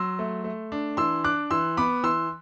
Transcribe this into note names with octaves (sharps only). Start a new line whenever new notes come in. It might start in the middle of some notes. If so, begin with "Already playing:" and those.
Already playing: F#3 C6 E6
A3
A3
D4
E3 C6 E6
D4 D6 F#6
E3 C6 E6
B3 B5 D6
E3 C6 E6